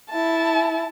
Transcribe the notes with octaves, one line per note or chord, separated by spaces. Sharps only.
E4 A5